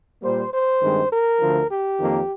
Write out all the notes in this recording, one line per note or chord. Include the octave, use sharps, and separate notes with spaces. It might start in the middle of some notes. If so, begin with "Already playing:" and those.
A#2 G3 A#3 C5
C5
G2 D#3 G#3 C4
A#4
D2 D3 F3
G4
F2 D#3 A#3